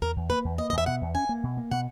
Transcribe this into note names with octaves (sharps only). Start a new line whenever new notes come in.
E2 A#4
E2
A#3 B4
E2
A#3 D#5
E2 D#5
E5
B2 F#5
E2
C#4 G#5
A#3
B2
A#3
B2 F#5